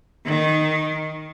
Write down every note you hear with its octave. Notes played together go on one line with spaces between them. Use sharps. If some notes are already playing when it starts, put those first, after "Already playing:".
D#3